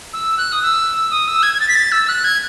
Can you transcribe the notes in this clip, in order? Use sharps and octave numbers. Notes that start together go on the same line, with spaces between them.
E6
F#6
D#6
E6
D#6
E6
G#6
G#6
A6
B6
A6
E6
F#6
G#6